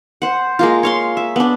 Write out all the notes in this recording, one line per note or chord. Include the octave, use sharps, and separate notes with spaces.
C5 F#5
G#3 A#3 F4
C#5 F5 C6
E5
B3 D4